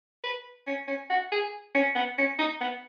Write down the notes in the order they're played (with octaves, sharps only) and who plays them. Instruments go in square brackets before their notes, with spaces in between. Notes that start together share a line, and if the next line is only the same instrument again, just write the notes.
[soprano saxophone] B4
C#4
C#4
F#4
G#4
C#4
B3
C#4
D#4
B3